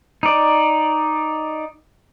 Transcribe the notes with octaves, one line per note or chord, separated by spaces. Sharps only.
D#4 D5